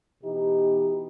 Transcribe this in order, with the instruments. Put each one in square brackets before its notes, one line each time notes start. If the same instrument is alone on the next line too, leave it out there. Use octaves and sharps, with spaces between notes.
[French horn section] B2 E3 D#4 G4